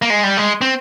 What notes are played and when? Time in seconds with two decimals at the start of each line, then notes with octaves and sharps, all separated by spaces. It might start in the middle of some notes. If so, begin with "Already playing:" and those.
0.02 A#3
0.10 G#3
0.23 G3
0.37 G#3
0.61 C4